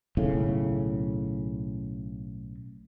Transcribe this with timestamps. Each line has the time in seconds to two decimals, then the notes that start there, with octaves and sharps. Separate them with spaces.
0.17 B1 A2 C#3